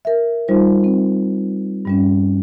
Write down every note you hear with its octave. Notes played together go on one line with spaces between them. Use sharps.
A#4 E5
G3 D#4 F4 C5
C4
G2 G3 C#4